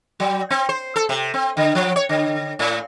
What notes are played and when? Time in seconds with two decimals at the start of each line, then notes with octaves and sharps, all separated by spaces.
0.20 F#3
0.50 C4
0.69 C5
0.96 A4
1.09 C3
1.34 C4
1.57 D3
1.75 F3
1.96 C#5
2.09 D3
2.59 A2